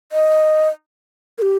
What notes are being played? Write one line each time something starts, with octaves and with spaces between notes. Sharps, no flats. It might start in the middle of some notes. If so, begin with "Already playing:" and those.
D#5
A#4
G4